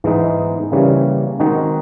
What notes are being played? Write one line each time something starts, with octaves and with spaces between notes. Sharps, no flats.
G#2 E3 G#3 B3 D#4
C#3 E3 G3 A#3 C#4
D#3 G#3 C4 D#4 F#4